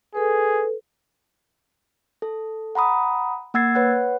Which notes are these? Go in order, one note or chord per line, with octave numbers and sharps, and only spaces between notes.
G#4 A4 B4
A4
F#5 A#5 B5 D#6
A#3 F#5 E6 G#6 A6 C7
B4 C#5 F#5 F#6